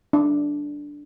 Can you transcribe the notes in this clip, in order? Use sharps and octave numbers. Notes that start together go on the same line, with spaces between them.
D4